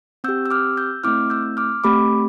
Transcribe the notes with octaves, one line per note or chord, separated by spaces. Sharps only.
C4 G4 E6 G6
E6
D6 F6
E6 G6
A3 C4 E4 D6 F6
E6 G6
D6 F6
A3 C4 G4 B5 D6